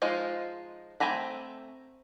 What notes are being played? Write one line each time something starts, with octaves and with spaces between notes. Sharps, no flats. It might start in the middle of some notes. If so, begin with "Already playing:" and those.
F3 G#3 D#4 F4
A3 C4 G#5 A#5 B5